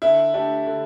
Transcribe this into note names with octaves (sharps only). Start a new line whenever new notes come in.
D3 E4
A3 D4 G4
D3